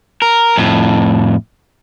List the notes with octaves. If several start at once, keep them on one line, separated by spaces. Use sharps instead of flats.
A#4
F2 A2